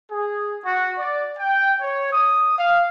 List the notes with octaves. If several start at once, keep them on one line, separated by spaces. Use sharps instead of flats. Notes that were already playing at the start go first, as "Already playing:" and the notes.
G#4
F#4
D5
G5
C#5
D#6
F5